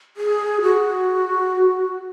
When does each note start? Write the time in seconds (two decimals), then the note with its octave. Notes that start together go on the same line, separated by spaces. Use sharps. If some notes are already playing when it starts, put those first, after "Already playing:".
0.17 G#4
0.62 F#4